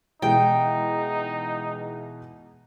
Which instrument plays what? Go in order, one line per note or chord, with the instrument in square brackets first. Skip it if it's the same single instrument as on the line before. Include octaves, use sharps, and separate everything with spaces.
[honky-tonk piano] B2 E3 G#3 [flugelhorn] D#4 [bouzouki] G5